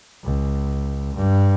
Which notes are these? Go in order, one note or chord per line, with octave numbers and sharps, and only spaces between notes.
C#2
G2